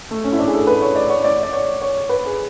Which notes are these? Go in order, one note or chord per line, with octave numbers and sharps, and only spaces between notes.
A3
C#4
E4
D4
G#4
A4
B4
C#5
D5
C#5
D5
D5
C#5
C#5
B4
G#4